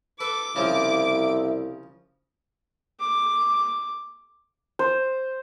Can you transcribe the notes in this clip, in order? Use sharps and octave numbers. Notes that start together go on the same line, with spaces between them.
A4 B4 D6
C2 C#3 F3 E4
D6
C5